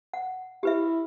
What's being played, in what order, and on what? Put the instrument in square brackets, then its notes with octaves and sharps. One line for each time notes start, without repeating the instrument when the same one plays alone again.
[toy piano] F#5
[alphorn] E4 [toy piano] G4 B4 E5